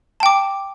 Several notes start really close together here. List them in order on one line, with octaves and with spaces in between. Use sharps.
A5 G5 D6